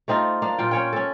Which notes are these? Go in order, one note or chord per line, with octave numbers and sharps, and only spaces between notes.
A3 C4 D#4 F4
A#3 D4
A#2 F4 G5
C#4 C#5 G5
C#4 A4